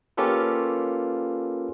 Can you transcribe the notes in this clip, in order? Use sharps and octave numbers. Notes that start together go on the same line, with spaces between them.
A#3 C#4 F4 G4 A4 B4